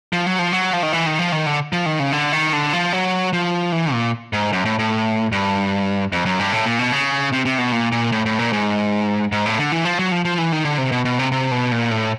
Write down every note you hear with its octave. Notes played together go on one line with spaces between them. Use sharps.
F3
F#3
F3
F#3
F3
D#3
E3
D#3
F3
D#3
D3
F3
D#3
C#3
D3
D#3
D3
F3
F#3
F3
E3
A#2
G#2
F#2
A2
A2
G2
F2
F#2
G2
A2
A#2
B2
C#3
C3
C3
B2
A#2
A#2
A2
A2
A#2
G#2
G#2
A2
D3
E3
F3
F#3
F3
F3
E3
D#3
D3
C3
B2
B2
C3
C3
B2
A#2
A2